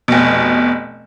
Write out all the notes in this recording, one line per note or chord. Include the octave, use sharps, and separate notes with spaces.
F1 B2